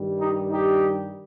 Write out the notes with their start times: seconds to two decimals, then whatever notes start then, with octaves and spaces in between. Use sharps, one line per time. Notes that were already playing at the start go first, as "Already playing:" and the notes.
Already playing: G2 D#3 G3
0.20 D#4 G4
0.50 D#4 G4